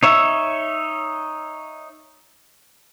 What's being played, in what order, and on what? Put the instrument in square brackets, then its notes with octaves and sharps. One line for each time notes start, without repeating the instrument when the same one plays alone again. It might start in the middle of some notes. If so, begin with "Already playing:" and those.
[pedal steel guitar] D#4 C#5 E5